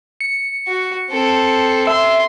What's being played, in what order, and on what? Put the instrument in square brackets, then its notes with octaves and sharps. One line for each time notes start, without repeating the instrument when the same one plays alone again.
[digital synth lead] C#7
[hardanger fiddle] F#4
C4 A4
[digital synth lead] E5 [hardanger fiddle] C6